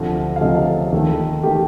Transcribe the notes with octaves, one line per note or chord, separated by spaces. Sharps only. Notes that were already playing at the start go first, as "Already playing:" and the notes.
Already playing: D2 C3 F3 A3
F5
D2 C3 F3 A3 D#5
A4
D#2 D#3 A3
D#3 A3 G4